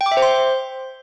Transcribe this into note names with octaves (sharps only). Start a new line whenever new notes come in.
G5
D6
E5
C5
C6